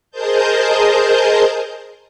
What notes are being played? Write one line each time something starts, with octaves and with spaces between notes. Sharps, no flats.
G#4 A#4 C5 D#5 A5 G6